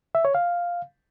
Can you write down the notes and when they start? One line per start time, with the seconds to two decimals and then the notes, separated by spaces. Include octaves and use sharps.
0.15 E5
0.25 C#5
0.35 F5